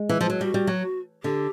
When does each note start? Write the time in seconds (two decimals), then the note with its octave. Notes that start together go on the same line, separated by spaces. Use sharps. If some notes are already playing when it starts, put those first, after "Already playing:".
Already playing: G#3
0.09 E3
0.21 F3
0.30 F#3
0.41 G3 F#4
0.54 G3
0.67 F#3
1.23 D3 G4